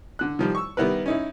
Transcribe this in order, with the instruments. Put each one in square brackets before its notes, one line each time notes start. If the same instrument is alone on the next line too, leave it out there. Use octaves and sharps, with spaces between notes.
[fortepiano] D3 F#6
D#3 F3 G3
C#6 E6
D#3 G3 B3 E4 A#4 B4
C#4 D#4 E4